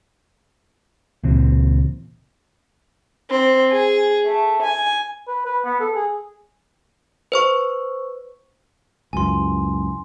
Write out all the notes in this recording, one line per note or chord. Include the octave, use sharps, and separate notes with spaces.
C#2 A#2 E3 C4
C4
G#4
A3
G#5
B4
B4
B3
A4
G#4
B4 C5 C#6
C#2 F#2 E3 G#5 C6